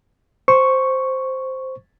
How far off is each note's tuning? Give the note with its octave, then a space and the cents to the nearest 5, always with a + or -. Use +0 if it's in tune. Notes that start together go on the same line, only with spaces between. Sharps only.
C5 +0 C#6 +0